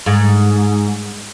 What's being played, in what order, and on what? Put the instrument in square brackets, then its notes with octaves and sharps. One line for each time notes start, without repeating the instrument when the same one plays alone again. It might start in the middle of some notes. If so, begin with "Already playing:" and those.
[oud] G#2